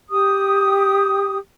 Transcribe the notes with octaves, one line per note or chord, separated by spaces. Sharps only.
G4 D#6